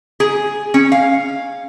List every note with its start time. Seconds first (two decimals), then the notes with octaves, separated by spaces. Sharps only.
0.20 G#4
0.74 C#4
0.92 F5